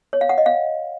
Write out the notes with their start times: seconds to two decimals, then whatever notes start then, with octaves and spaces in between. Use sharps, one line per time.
0.13 C#5
0.21 F5
0.29 F#5
0.38 D#5
0.46 F5